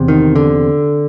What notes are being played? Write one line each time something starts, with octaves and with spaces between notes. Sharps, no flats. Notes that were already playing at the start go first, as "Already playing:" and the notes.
Already playing: E2 C3
D#3
D3